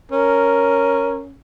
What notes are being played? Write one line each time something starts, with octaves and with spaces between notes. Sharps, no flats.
C#4 A#4